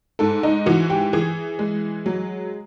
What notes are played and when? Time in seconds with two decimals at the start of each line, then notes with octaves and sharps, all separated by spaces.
0.19 G#2 A4
0.43 D#4
0.66 E3 F#4
0.90 G4
1.13 E3 G#4
1.59 G#3
2.06 F#3